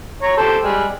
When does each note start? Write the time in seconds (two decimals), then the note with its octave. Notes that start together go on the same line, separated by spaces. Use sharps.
0.22 C#5 A#5
0.37 G4 A4 C5
0.63 G3 G#3